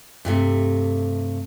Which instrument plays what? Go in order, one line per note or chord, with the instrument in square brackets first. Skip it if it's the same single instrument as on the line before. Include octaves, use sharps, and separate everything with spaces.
[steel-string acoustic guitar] G2 C3 A3